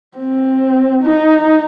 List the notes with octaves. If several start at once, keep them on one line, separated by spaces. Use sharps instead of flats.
C4
D#4